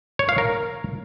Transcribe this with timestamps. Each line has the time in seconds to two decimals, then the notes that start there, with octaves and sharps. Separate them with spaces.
0.19 C#5
0.29 F5
0.38 A#4